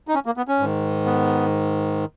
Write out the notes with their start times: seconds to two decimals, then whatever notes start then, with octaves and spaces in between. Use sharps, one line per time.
0.08 D#4
0.15 C#4
0.26 A#3
0.37 B3
0.48 C#4
0.59 G#2 D#3
1.06 B3